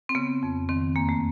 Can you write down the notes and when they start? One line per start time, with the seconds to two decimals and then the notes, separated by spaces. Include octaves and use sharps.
0.09 C4
0.15 C#3 B3
0.43 F2
0.69 D#3 C4
0.96 E2 A#3
1.09 A3